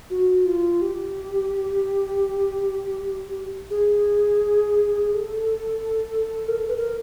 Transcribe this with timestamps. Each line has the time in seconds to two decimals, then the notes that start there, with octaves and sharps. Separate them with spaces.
0.10 F#4
0.46 F4
0.82 G4
3.70 G#4
5.14 A4
6.48 A#4
6.59 A4
6.68 B4
6.77 A#4